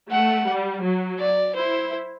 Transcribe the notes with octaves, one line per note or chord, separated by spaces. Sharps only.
A3 F#5
G3
F#3
D5
E4 C5